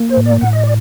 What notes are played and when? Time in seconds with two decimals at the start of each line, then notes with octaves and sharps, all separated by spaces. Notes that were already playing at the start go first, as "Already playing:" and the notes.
Already playing: A#3
0.09 C5
0.17 A2
0.26 D5
0.41 A2 F#5
0.53 D#5
0.63 D5